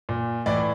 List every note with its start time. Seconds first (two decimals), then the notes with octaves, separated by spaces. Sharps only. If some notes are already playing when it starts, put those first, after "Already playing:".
0.09 A#2
0.46 A2 E3 D5